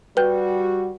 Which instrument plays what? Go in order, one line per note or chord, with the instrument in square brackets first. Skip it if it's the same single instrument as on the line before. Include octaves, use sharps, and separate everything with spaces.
[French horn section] G3 F#4 [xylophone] B4 G5 G6